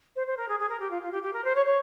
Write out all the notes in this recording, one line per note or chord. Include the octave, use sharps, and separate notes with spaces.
C5
C5
A#4
G#4
G#4
A#4
G4
F4
F4
G4
G4
A#4
C5
C#5
C#5